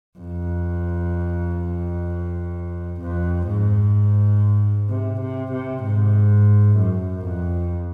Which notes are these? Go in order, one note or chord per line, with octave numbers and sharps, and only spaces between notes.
F2
F2
G#2
C3
C3
C3
G#2
F#2
F2